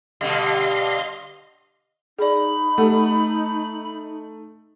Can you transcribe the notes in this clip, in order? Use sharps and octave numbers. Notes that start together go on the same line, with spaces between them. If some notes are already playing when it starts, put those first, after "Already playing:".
B2 D3 G3 D#5 F5 C6
D#4 G#4 D5 B5
A3 G4 A4 F#5